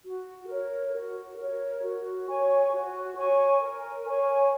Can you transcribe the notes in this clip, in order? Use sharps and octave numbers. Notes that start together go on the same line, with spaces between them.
F#4
A#4 C#5
F#4
A#4 C#5
F#4
C#5 G#5 C#6
F#4
C#5 G#5 C#6
A#4
C#5 G#5 C#6